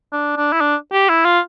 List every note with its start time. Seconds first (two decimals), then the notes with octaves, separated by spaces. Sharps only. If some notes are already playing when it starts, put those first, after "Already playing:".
0.13 D4
0.37 D4
0.52 E4
0.61 D4
0.93 G4
1.09 E4
1.25 F4